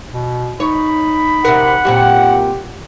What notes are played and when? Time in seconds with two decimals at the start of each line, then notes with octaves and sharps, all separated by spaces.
0.13 B2
0.60 D#4 C#5 B5
1.45 C3 A#4 F#5
1.85 F#2 A#2 C4 G4